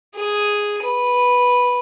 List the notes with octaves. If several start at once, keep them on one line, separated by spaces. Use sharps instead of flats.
G#4
B4